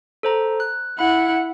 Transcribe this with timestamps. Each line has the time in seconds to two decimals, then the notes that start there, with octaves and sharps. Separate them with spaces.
0.23 A4 C5 A#5
0.60 F#6
0.99 E4 F#5 B5